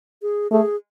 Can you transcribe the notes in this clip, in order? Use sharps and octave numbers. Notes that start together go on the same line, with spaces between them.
G#4
A3 G#4